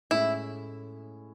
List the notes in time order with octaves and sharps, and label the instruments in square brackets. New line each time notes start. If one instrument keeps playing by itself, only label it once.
[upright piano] A2 G#3 C#4 [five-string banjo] E4